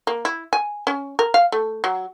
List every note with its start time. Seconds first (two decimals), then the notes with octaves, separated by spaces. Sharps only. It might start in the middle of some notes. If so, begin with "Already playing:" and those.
0.07 A#3
0.25 E4
0.53 G#5
0.87 C#4
1.19 A#4
1.34 F5
1.52 A3
1.84 F#3